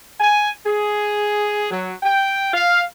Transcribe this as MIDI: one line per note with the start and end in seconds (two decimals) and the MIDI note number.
0.20 0.50 80
0.65 1.69 68
1.71 1.93 54
2.03 2.49 79
2.54 2.83 77